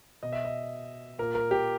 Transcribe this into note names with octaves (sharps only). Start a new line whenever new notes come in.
B2 D#5
E5
D#5
A#2 A#4
A#4
G4